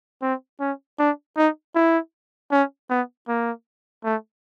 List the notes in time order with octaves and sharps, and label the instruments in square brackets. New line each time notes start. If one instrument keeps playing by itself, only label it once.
[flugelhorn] C4
C#4
D4
D#4
E4
C#4
B3
A#3
A3